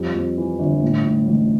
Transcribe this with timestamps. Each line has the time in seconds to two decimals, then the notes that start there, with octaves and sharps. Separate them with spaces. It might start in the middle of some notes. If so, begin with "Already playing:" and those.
Already playing: F2 G3
0.14 F2
0.37 E3
0.59 G1
0.83 A2
1.05 A2
1.27 A1